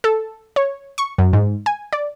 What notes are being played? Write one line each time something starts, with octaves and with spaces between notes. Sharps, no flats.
A4
C#5
C#6
F#2
G#2
G#5
D5